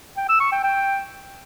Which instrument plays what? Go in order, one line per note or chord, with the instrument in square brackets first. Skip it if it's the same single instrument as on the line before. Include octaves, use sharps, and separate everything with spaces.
[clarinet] G5
E6
C#6
G5
G5